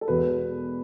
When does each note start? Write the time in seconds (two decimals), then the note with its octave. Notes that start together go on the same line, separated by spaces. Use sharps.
0.01 A4
0.08 E1 E2 B2 F#4 B4